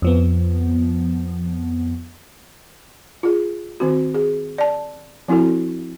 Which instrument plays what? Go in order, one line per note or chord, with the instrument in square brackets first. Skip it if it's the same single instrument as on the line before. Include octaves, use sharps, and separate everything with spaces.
[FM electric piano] F2 F3 B3
[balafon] F4 G#4
D#3 C4 F#4
G#4
D5 A5
F3 C4 E4 F#4 A4